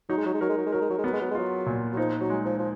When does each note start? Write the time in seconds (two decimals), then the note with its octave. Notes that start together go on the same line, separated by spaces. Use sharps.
0.09 F#3 D#4
0.17 G#3
0.26 F#3
0.34 G#3
0.41 F#3 A#4
0.49 G#3
0.58 F#3
0.66 G#3
0.72 F#3 A#4
0.81 G#3
0.90 F#3
0.98 G#3
1.04 F#3 B3
1.13 G#3
1.22 F#3
1.31 G#3
1.35 F#3 F4
1.66 A#2
1.94 F#3
1.97 F3 D#4
2.21 F#3
2.30 G#3
2.45 F3
2.59 F3